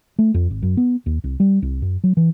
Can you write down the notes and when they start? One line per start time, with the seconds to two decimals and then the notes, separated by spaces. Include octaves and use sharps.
0.19 A3
0.34 F2
0.50 G#1
0.62 F#2
0.77 B3
1.06 D#2
1.24 C2
1.40 G3
1.62 C2
1.82 F#2
2.04 F#3
2.17 E3